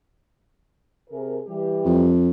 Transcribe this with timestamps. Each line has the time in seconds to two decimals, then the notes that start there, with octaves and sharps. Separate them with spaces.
1.09 C3 G#4 A#4
1.46 E3 G3 G4
1.85 F2